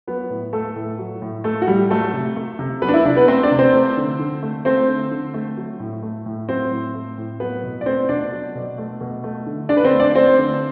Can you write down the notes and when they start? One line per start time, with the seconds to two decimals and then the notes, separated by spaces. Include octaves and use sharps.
0.07 F#3 B3 B4
0.30 A2
0.53 A3 A4
0.76 A2
0.99 F#3
1.22 A2
1.44 A3 A4
1.62 F#4
1.67 A2 G3 G4
1.90 F#3 A3 A4
2.13 C3
2.36 A3
2.59 C3
2.82 F#3 B3 B4
2.89 D4
2.94 E4
3.05 C3 D4
3.16 B3 B4
3.28 A3 C4 C5
3.43 D4 D5
3.51 C3
3.59 C4 C5
3.74 A3
3.97 D3
4.19 D3
4.43 A3
4.65 A3 C4 C5
4.88 D3
5.11 D3
5.34 A3
5.57 F#3
5.80 A2
6.03 A3
6.26 A2
6.48 F#3 C4 C5
6.71 A2
6.94 A3
7.18 A2
7.40 F#3 B3 B4
7.63 B2
7.81 D5
7.86 A3 C4 C5
8.09 B2 D4 D5
8.32 F#3
8.55 B2
8.78 A3
9.01 B2
9.24 A3
9.46 D3
9.69 D3 D4 D5
9.77 B4
9.84 C4 C5
9.93 A3
9.99 D4 D5
10.15 A3 C4 C5
10.38 D3